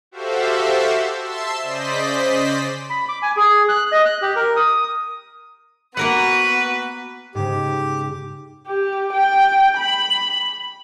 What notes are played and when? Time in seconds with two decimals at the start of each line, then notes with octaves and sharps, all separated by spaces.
0.11 F#4 G4 A4 C5 E5 F5
1.19 E5 A5 C6 E6
1.62 C#3 C5 D5 D#5 B6
2.90 B5
3.09 D6
3.22 G#5
3.37 G#4
3.69 F#6
3.92 D#5
4.06 F#6
4.22 G4
4.36 A#4
4.56 D#6
5.97 A#3 B3 F#4 A#4 B4 F#5
7.35 G#2 C#3 G4
8.67 G4
9.13 G5
9.78 B5